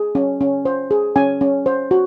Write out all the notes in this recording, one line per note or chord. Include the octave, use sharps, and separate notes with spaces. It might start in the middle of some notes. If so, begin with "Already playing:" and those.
Already playing: G#4
C#4
C#4
C5
G#4
C#4 G#5
C#4
C5
F#4